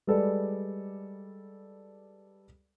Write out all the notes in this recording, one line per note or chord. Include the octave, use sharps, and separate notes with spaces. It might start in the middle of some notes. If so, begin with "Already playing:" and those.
G3 G#3 A4 B4 D5